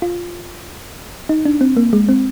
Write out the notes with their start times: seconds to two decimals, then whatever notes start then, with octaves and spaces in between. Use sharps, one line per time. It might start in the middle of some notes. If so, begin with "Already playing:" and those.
0.02 F4
1.29 D#4
1.45 D4
1.61 C4
1.77 A#3
1.93 G#3
2.09 C4